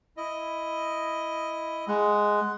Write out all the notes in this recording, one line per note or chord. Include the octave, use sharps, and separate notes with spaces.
E4 D#5
G#3 F#5